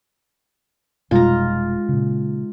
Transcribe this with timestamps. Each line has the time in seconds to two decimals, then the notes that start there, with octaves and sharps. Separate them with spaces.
1.11 F1 B2 G3 G#3 D#4 F4 A#5
1.89 A#2 C#3